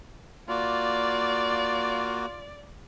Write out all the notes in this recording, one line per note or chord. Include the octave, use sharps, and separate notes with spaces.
A#3 F4 F#4 D5